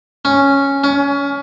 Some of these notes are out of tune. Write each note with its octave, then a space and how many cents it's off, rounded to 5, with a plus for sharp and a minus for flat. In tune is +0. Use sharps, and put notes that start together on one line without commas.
C#4 +0
C#4 +25